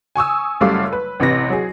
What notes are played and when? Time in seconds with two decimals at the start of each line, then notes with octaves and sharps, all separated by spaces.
0.16 G#5 C#6 D#6 E6
0.61 F#1 F#2 G3 A3 F5 D6
0.93 B4
1.20 A1 C3 B4 A#6
1.50 F#3 G#4